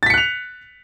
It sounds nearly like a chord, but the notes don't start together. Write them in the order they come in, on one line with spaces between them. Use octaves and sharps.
A6 B6 C#7 F#6 F7